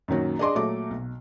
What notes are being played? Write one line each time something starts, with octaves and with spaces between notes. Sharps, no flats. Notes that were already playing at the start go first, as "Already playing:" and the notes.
F#2 A#2 D#3 F#3
D4 G#4 D#5 C6 D6
A#2 F#3 A3 D6
B1